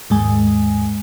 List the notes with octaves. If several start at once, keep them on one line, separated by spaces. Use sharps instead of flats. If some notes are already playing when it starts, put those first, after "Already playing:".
D#2 G#2 G#3 G#5